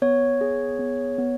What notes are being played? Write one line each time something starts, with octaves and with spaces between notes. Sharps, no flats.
B3 C#5
G#4
B3
B3